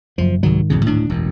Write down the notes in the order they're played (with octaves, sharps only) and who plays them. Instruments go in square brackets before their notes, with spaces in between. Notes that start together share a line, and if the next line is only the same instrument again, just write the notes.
[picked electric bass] F#1 F#2 [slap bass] F3
[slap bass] C2 F#3 [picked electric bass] G#2 D#3
[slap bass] B1 E2 C#3
D1 A2 D4
E1 A1 F#2